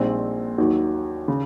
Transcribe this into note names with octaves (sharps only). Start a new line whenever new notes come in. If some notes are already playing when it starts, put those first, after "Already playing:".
Already playing: A#1 A#2 G3 C4 D#4
D#2 D#3 F#3
C#3